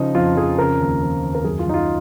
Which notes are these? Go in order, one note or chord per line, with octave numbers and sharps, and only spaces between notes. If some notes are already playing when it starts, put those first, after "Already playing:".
Already playing: C#3 F3 D#4
F2 F4
F2 G#4
C#3 A#4
D#2
F3
D#2
A#4
F#2 G#4
F4
F#2 D#4
F4